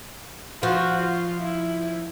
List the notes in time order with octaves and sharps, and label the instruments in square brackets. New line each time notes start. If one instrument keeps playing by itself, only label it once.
[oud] F3 [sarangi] F#4
[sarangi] F4
E4